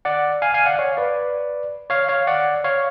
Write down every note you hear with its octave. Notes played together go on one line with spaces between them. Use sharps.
D5 F#5
F5 G#5
F5 G#5
D5 F#5
C#5 F5
B4 D5
C#5 F5
C#5 F5
D5 F#5
C#5 F5